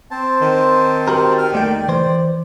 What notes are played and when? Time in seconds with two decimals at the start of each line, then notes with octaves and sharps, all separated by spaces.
0.11 C4 C5 A5
0.41 D#3
1.08 F#4 G4 A#4
1.38 F6
1.53 D#2 A3 D5 G5
1.88 E3 C5